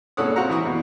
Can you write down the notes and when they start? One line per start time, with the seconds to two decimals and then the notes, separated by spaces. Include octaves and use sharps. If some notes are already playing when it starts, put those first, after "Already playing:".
0.17 A#2 C#3 A4 C#5 F#5 D#6
0.36 C4 F#4 F5 F#5 A#5
0.49 E3 E4 C#6 D#6
0.66 E2 B2